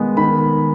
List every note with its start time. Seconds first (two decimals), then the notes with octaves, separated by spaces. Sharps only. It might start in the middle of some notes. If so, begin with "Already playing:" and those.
Already playing: D#3 G#3 B3 D#4 G#5
0.17 D#3 B5